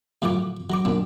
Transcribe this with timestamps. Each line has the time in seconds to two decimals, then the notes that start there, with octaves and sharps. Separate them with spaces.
0.22 A2 F3 F#3 F#5 D6
0.70 F#3 A#5 D6
0.85 B1 A#2 D4